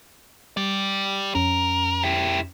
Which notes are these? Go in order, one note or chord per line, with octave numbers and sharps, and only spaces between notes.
G3 G4 D5
F2 C#4 A#4
E4 G4